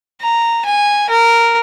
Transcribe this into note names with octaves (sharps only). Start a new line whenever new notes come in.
A#5
G#5
A#4